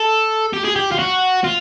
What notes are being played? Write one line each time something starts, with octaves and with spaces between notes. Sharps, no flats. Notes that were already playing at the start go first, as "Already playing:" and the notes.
Already playing: A4
G4
G#4
G4
F4
F#4
F4